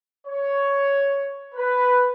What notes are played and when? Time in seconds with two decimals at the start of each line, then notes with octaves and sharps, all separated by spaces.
0.27 C#5
1.55 B4